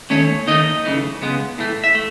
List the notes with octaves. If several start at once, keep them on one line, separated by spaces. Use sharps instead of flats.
D#2 D#3 A3 C#4 C#5
D#2 D#3 A3 D#4 D#5
F#2 C#3 E3 A3
C#2 C#3 G#3 B3
A2 E3 A3
E5
A3